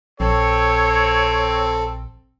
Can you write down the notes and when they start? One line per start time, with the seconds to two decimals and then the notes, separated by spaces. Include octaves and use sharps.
0.20 A#1 C4 A4 C#5